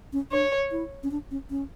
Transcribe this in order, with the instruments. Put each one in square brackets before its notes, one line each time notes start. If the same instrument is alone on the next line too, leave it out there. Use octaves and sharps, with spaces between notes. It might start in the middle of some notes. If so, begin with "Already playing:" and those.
[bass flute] C#4
[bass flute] D4 [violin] C#5
[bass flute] E4
C#4
D4
C#4
C#4